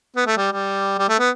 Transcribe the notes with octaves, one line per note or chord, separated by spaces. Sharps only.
B3
A3
G3
G3
G3
A3
B3